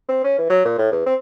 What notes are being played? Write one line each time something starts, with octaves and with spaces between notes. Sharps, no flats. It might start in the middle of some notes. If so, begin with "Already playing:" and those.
C4
C#4
E3
F#3
A#2
A2
E2
C4